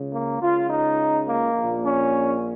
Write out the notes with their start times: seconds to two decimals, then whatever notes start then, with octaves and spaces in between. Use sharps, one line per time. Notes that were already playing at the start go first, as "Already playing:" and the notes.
Already playing: C#2 C#3
0.13 A#3
0.41 C#2 C#3 F4
0.70 D#4
1.26 A#3
1.54 A#1 A#2
1.83 C#4